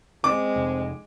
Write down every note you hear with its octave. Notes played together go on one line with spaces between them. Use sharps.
G#3 C4 D6
F1